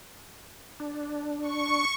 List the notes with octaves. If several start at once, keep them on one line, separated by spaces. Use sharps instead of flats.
D4
C#6